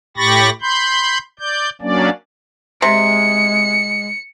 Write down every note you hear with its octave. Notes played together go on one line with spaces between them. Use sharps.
A2 G4 B5 C#6 A6 A#6
B5 C6 G6
D5 G6
F#3 A#3 C#4 D4 D5
C3 G#3 C#7